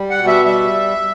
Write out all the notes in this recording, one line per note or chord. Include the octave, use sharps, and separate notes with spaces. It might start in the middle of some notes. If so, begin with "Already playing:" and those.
Already playing: G3
F#5
B2
E5
G3 E5